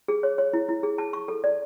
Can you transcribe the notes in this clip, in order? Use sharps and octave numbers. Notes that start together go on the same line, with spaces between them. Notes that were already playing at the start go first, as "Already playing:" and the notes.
G#4
C#5
C#5
E4
E4
G#4
A5
C#6
A4
D5